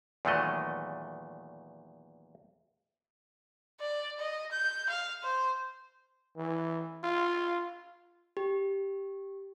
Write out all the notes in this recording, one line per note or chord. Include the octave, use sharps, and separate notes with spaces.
E2 A#2 D#3 F#3 A3 D#5
D5
D#5
G6
F5
C5
E3
F4
G4